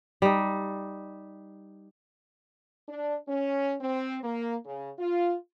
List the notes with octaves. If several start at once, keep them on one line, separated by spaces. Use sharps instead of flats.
G3 D#4
D4
C#4
C4
A#3
C#3
F4